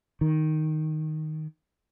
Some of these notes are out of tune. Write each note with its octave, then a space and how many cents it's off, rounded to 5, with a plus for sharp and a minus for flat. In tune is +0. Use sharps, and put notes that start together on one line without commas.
D#3 +0